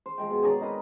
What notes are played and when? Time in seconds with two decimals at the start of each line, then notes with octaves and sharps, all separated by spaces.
0.06 C5
0.18 F3 G#3 G5
0.30 B2
0.43 G#4 C#5 D5 A#5
0.60 C4 D#4 A#4 B4